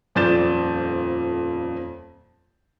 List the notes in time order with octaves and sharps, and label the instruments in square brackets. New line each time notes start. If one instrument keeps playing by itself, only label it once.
[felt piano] D#1 F2 D5 G6 A6 E7